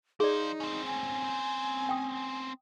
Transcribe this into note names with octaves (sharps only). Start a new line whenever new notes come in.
F3 D#4 G#4 C5 D5
C4 C#4
G#5
G5 D#6